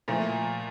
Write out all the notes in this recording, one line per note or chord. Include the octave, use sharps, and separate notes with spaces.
A#2 F3 A3